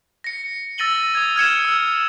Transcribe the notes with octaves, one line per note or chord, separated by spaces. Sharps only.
A#6 C#7
E6 A6 A#6 D#7 F#7 G7
D#6 G#6
F6 G#6 C#7 E7
E6